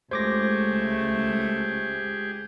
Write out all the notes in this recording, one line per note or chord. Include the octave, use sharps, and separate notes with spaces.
C#2 A3 G4 G#4 C5 D6 A#6